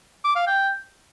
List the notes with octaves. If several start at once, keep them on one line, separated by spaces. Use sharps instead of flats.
D6
F5
G5